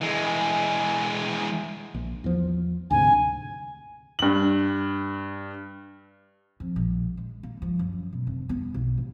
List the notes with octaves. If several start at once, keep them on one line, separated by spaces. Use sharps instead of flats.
E3 G#3
A#1
E2 F3
D2 G#2 C3 G#5
G2 F#7
F2
A#1
G#3
A#3
F3
F#2
B2
F1
B3
B1
A1